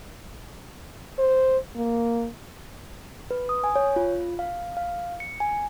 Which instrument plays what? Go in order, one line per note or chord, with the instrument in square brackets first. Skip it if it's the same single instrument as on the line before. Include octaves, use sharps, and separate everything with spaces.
[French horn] C5
A#3
[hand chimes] B4
D#6
G#5
C#5
F4
F5
F5
C#7
G#5